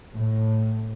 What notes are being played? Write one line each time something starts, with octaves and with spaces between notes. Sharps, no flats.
A2